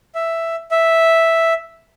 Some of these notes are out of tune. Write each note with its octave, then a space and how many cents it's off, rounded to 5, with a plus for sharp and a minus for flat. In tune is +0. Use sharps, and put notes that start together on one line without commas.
E5 +5
E5 -5